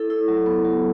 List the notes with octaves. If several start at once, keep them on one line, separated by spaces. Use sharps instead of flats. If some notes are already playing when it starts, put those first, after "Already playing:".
Already playing: E4 A4
E4
F#3
B3
F#3